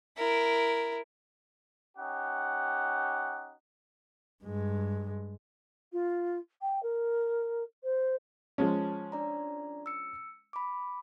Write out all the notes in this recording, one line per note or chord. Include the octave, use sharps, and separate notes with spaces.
E4 A#4
C#4 D#4 G4 F#5
G2 G#3
F4
G5
A#4
C5
F3 G#3 C#4 A5
D4 D5 A#5
E6 C#7
B5 D6